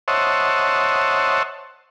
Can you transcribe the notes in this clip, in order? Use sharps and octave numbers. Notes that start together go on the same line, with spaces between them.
C5 C#5 D#5 E5 F#5 A5